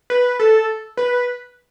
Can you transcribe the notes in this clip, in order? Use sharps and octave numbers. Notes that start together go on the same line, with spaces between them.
B4
A4
B4